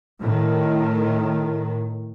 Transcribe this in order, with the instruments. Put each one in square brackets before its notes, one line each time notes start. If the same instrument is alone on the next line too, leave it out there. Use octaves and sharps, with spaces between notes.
[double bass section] A2 D#3